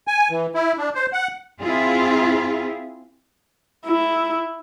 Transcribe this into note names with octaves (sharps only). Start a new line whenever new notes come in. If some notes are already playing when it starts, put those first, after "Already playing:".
G#5
E3
E4
D4
C5
F#5
C4 E4 F4 G#4
E4